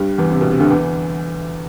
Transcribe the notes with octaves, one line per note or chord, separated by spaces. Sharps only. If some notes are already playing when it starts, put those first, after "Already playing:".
Already playing: G2 G3
E2 E3
C3
B2
C3
D2 D3
E2 E3